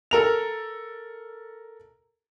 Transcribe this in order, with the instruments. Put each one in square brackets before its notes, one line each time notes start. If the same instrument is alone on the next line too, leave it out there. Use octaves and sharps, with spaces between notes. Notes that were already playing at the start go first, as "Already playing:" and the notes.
[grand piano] A4 A#4 F7